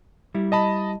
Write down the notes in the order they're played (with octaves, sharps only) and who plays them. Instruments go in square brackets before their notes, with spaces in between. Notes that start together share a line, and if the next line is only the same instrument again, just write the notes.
[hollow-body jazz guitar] G3 E4
[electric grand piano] D#5 A5 B5